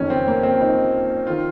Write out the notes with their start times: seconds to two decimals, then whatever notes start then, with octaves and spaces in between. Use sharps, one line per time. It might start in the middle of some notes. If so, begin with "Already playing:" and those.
Already playing: F#1 F2 D#3 C#4
0.10 C4
0.28 A#3
0.43 C4
0.61 D#4
1.27 D#3 F4